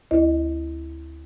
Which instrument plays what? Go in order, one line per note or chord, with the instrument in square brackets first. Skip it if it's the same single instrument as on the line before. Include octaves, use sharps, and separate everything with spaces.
[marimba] D2 E4 D#5